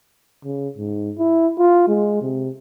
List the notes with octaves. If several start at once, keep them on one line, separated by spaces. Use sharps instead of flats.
C#3
G#2
E4
F4
G#3
C3